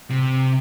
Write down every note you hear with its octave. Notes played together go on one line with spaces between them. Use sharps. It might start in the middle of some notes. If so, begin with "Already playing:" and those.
C3